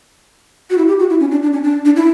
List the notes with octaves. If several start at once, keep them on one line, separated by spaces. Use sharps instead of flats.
F#4
E4
G4
F#4
E4
C#4
D4
D4
C#4
D4
D4
E4